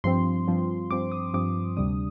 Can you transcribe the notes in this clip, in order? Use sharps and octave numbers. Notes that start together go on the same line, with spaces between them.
G2 F3 C4 C6
G2 F3 C4
G2 F3 C4 D6
D#6
G2 F3 C4 D6
D2 C3 G3 D4 D#6